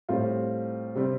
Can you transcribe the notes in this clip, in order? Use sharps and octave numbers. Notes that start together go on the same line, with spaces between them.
A2 G3 C4 F4
C3 G3 C4